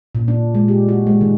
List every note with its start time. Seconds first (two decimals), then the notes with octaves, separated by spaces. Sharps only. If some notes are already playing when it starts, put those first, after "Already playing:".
0.15 A#2
0.28 D4
0.55 G#3
0.68 G4
0.89 F#4
1.07 G#3
1.21 D#3